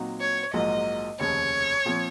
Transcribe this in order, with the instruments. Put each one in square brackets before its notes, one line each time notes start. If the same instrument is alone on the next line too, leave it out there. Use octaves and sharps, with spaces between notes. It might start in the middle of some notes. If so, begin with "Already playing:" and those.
Already playing: [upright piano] A#2 F#3 C4 D#4 F#4
[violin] C#5
[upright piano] A#1 G#2 F#3 A#3 F4 [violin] D#5
[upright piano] F1 D#2 C#3 [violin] C#5
[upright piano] A#2 F3 C4